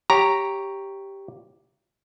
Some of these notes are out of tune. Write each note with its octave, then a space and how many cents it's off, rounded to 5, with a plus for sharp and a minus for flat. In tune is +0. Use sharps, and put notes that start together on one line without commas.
G4 +0 C#5 +0 A#5 +0